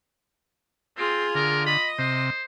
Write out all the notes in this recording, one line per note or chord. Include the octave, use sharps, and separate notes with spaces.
C4 F4 G#4
D3 A#4
D#5 B5
C3 C5